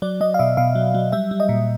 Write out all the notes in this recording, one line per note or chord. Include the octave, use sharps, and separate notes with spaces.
F#3 D5
F#3 D#5
F5
B2 E5
B2 F5
F#3
F#3
G3 E5
G3
D#5
A#2